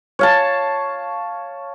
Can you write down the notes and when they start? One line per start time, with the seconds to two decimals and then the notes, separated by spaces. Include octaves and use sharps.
0.19 C#5 F5 A5